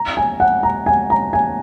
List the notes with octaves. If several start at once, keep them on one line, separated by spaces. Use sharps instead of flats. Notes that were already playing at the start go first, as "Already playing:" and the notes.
Already playing: A#5
G#5
F#5
A#5
G#5
A#5
G#5